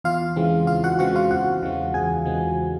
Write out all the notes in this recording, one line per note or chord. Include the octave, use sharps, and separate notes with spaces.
E2 F4 F5
C#3 E3 G#3 C4
E2 F4 F5
F#4 F#5
C#3 E3 G#3 C4 F#4 F#5
F4 F5
E2 F#4 F#5
C#3 E3 G#3 C4
E2 G#4 G#5
C#3 E3 G#3 C4